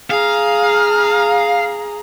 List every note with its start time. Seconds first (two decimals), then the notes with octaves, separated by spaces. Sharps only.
0.10 G#4 F5 A#5